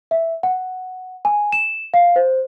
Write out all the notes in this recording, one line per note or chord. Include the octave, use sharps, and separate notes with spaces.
E5
F#5
G#5
E7
F5
C5